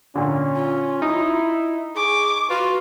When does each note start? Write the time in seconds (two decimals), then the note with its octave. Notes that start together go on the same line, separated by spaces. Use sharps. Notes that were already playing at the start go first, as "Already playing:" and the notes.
0.15 A#2 D3 C#4
0.55 F4
1.02 D#4 E4
1.96 G#4 C#6 D6
2.50 F4 F#4 B4